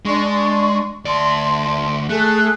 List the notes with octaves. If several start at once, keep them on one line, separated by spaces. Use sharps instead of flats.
G#3 D4 C6 C#6
D2 D5 A5 C6
A3 G#4 A4 F#6